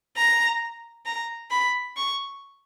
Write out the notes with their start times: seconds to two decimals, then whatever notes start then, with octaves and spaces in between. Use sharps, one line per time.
0.17 A#5
1.06 A#5
1.50 B5
1.96 C#6